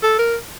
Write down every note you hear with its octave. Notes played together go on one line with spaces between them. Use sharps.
A4
A#4